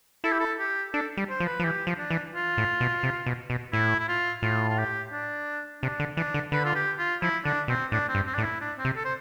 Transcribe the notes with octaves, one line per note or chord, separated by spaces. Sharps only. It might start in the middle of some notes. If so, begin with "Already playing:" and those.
E4 A4
G4
A4
G4
D4 A4
G3
C5
F3
B4
F3
E3 G4
F3
D4
E3
F4
A2
B2
C3
B2
B2
A2 E4
E4
F4
A2 F4
F4
G4
D4
C3 D4
D3
E3 D4
D3
D3 B4
F4
G4
F4
F3 E4
D3 D4
B2 C4
A2 D4
C4
G2
C4
A2 D4
E4
D4
C4
C3
A4
C5